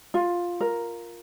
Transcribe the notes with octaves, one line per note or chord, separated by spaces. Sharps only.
F4
A#4